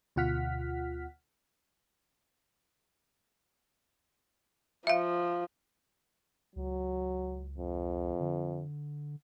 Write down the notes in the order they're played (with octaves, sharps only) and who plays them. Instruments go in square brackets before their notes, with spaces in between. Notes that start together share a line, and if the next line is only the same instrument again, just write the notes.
[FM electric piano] D2 B2 F4 F#5 F6 B6
[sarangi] F3 [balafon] E5 F5
[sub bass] C#2 [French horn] F#3
[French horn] F2
[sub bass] D3